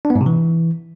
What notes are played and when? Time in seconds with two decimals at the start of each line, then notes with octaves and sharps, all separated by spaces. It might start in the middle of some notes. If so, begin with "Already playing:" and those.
0.05 D4
0.10 B3
0.16 G#2
0.21 C3
0.26 E3